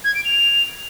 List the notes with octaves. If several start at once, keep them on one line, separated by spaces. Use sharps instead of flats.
G#6
D7
F7